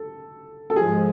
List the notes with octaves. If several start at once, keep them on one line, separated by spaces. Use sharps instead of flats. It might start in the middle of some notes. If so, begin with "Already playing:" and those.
Already playing: A4
A4
G#2 F3 G#3 G#4